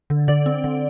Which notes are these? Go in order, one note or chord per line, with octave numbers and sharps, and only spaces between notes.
D3
D3 D5
C4
D3